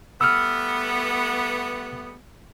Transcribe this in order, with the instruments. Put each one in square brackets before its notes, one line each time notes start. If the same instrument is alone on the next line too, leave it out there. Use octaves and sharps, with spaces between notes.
[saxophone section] G3 A3 B3 [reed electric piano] E6 F6